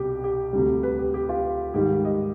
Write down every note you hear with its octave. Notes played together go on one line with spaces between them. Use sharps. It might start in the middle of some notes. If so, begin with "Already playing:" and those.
Already playing: C2 B2 G3 G4
G4
D2 C3 G3
B4
G4
G4
F4
G#2 D#3 G3 G4
D#5